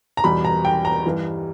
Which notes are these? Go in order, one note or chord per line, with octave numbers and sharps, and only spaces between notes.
A#5
E2 B2 G3 B5
A#5
G5
A#5
G2 E3 G3